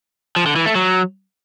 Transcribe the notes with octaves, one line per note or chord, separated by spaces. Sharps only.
F3
D3
E3
A3
F#3